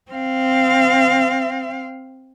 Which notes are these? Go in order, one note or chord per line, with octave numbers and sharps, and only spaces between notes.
C4 F5